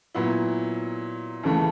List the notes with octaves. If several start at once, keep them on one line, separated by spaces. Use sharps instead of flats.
A#2 F#3 B3 E4
D#2 C#3 E3 A3